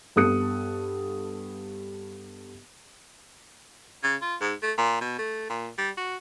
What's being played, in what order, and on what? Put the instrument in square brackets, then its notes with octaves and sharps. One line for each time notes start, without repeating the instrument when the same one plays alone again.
[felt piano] G2 B3 A4 D#6 F#6 C#7
[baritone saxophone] C#3
F4
G#2
A3
A#2
B2
A3
A#2
G3
F#4